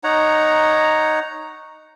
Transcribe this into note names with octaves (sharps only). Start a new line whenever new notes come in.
D#4 C#5 F#5 A#5